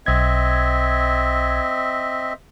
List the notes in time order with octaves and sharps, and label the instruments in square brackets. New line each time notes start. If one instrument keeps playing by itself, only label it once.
[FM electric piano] B1 G#6 [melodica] C4 D#5 E5